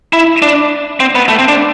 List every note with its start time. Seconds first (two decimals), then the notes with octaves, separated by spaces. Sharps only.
0.13 E4
0.42 D4
1.00 C4
1.15 B3
1.29 A3
1.39 C4
1.48 D4